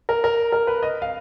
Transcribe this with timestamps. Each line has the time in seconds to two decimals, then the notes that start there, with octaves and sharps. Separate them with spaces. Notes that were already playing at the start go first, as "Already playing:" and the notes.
0.09 A#4
0.24 A#4
0.52 A#4
0.67 B4
0.83 D#5
1.02 F5